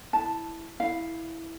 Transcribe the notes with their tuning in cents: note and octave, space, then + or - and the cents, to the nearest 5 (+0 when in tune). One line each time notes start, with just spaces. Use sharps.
E4 +0 A5 +0
E4 -5 F5 +0